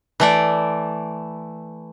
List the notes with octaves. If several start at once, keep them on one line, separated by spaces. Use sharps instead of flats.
E3 A3 D5